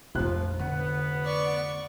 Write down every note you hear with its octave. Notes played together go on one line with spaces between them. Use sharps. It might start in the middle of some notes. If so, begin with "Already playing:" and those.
F1 A#1 A#2 F3 F#6
D3 B3 F#5
D5 C#6